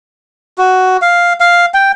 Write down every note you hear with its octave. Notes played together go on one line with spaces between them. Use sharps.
F#4
F5
F5
G5